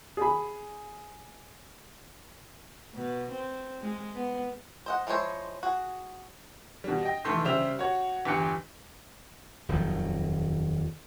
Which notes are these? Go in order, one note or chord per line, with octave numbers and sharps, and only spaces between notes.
G#4 B5
B2
C4
G#3
B3
C5 D#5 F#5
F3 G#3 E4 C5 C#5
F#4 G#4
B2 G3
D#5 G5
F1 E3 A3 C6 G6
C#3 G3 G4 C5 E5 F7
F#4 C#5
G1 E2 G4 F#6 C#7
D#1 F2 D#3 F#3